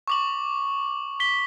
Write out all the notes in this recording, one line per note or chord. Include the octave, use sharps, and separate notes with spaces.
C#6 D6 F#7
B6 G7